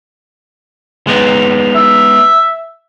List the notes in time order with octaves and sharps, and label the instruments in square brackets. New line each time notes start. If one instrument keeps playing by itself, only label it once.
[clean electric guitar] G#3 B3 D#4
[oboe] E5